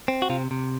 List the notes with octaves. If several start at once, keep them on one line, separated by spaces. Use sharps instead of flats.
C4
F#4
C3 F4
C3